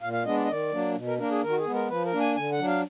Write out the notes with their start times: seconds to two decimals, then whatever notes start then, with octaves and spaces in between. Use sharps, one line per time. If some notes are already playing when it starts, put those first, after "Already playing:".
0.01 A#2 F5
0.13 F5
0.25 G#3 B3 D4 D#5
0.36 D5
0.44 D#5
0.48 D#3 D5
0.72 F#3 A#3 D4
0.95 B2
1.07 A#4
1.18 A#3 D4 A#4
1.30 G#4
1.41 D#3 A#4
1.50 F#4
1.58 G#4
1.66 G#3 B3
1.73 A#4
1.88 F3 B4
2.05 A#4
2.13 A#3 D4
2.20 G#5
2.36 D3 G#5
2.52 F#5
2.59 F#3 D4
2.67 F5